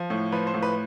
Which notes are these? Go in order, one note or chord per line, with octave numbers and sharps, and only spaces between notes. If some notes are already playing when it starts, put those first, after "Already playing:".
Already playing: F3
A2
F3 B4
C5
A2
B4